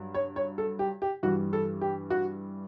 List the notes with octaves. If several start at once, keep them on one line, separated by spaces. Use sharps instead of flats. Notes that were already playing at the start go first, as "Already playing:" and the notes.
Already playing: G2 F#3
C#5
C#5
A4
G4
G4
G2 E3 G3 F#4
A4
G4
F#4